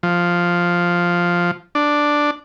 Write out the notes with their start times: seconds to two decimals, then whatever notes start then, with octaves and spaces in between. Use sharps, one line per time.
0.03 F3
1.75 D4